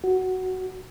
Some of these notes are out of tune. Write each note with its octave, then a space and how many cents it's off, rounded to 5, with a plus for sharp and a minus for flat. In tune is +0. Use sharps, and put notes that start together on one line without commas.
F#4 +10